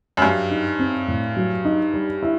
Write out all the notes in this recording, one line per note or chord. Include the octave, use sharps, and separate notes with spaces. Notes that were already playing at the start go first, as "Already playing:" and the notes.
F#2
G2 F#3
D#4
C4
A2
F#3
D#4
G3
E4